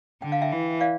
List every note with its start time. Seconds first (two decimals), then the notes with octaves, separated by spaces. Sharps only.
0.22 D3 G5
0.32 F5
0.42 E5 G5
0.52 E3
0.80 D5 F5